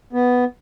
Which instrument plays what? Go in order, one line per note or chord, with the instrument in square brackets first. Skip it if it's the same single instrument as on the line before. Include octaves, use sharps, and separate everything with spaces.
[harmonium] B3